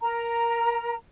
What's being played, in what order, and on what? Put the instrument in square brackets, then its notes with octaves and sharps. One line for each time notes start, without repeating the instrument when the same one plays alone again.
[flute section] A#4 A#5